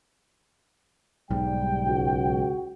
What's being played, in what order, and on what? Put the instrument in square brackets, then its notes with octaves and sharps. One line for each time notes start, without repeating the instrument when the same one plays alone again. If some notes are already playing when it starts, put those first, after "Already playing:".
[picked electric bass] B1 G#2 [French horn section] G3 [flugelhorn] G5
[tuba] C#2 [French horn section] F#4